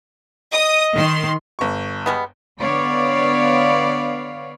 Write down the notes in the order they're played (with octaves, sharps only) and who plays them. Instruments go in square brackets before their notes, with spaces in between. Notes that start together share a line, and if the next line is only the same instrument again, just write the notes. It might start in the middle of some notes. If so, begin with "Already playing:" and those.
[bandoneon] D#5 [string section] D#6
[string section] D#3 C6
[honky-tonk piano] G1 C#6
[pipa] G3 G#3 B3
[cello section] D3 B3 C#5 D5 F5